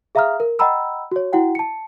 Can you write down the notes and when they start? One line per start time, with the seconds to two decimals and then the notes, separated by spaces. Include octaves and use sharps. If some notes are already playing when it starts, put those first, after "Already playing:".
0.15 G#4 E5 F5 A#5 D#6 F6
0.40 A#4
0.59 D#5 F#5 G5 A#5 B5 E6
1.11 F#4 C#5
1.33 E4 F#4 F#5 G5
1.55 A5 C#7